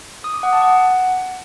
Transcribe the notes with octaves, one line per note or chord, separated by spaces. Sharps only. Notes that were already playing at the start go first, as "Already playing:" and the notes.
D#6
D6
F#5
A5
F#5